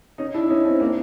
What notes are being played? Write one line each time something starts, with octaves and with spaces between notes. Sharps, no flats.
C#4 D#4
D4 E4
C#4 D#4
C4 D4
A#3 C4